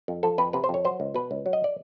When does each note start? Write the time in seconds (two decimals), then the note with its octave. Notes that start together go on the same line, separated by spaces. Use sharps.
0.08 F2
0.23 F3 A4
0.38 F2 B4
0.53 C3 B4
0.64 C5
0.69 F2 C#5
0.85 F#3 C5
1.00 C#2
1.14 B2 B4
1.31 C#2
1.46 F#3
1.53 D#5
1.64 D5